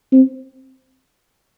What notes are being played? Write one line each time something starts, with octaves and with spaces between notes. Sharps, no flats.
C4